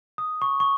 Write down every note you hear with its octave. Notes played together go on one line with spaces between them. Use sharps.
D#6
C#6
C#6